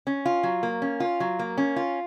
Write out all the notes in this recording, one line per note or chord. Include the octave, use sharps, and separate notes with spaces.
C#4
F4
F#3
A#3
C#4
F4
F#3
A#3
C#4
F4